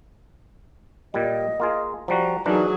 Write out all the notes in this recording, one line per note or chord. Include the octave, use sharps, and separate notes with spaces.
A#2 G3 D#5
A#3 F4 G#4
F3 G3 F#4 A#5
E3 F#3 D4 D#4 G#4 A#4